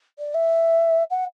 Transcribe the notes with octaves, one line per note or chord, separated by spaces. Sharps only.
D5
E5
F#5